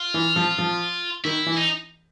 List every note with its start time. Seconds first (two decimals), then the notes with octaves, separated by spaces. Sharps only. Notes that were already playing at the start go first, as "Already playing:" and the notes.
Already playing: F4
0.14 E3
0.36 F3
0.58 F3
1.24 D#3 E4
1.46 E3
1.57 D#4